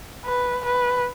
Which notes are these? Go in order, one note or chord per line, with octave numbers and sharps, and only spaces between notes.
B4
B4